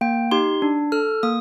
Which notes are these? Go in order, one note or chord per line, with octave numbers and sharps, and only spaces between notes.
A#3 G5
D#4 G4 C6
D4
A4 F6
A#3 D#6